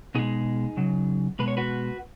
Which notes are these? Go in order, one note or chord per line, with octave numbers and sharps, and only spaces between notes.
B2 G#3 D#4 G#4
C#3 F#3
B2 G#3 B4
C#5
F#4 B4